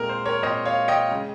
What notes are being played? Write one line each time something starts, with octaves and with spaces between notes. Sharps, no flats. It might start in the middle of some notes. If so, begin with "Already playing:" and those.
Already playing: A#2 G#3 C4 A#4
C5
A#4 C#5
A#2 G#3 C4 C5 D#5
C#5 F5
D#5 G5
C#3 G#3